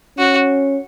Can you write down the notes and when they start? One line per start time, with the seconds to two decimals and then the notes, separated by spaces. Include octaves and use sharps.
0.18 C#4 F#4